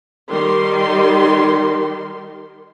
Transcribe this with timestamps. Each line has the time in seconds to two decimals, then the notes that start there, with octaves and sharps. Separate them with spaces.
0.29 D#3 G3 C6